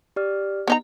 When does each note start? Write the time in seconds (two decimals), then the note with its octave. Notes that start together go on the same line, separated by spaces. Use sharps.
0.16 G4 D5 F6
0.68 B3 D#4 A#5